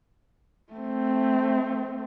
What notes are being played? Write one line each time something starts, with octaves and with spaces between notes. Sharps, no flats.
A3 C4